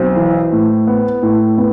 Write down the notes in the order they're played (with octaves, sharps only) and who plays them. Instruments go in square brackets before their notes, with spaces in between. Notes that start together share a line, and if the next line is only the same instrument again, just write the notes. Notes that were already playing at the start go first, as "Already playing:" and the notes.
Already playing: [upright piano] B1 [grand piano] C4 C5
[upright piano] E3
A2
B3
A2
[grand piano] B3